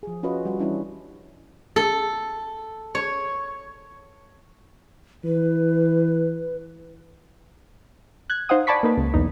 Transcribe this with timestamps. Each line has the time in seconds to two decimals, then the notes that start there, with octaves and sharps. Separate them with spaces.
0.03 F3 G#4
0.23 C#4 F4 F#4 B4 D#5
0.45 G3 F#4
0.59 E3 G3 C#4 D4 E4
1.76 A4
2.95 C#5
5.24 E3 B4
8.30 F#6 G#6
8.49 D#4 C5 F5 F#5 D#6
8.67 D5 G#5 A5 B5 C#6 B6
8.83 A#3 D#4 B4
8.97 C#2
9.14 B1 E2 D#4